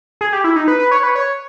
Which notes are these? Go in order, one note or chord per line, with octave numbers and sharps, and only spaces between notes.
G#4
G4
E4
D#4
B4
B4
C#5
B4
C#5